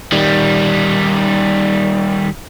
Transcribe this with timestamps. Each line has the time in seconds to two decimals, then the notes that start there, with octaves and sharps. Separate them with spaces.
0.12 D#3 G3